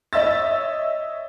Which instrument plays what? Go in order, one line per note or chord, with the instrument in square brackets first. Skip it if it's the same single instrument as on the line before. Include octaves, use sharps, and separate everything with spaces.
[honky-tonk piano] C#5 D#5 E5 E6 A6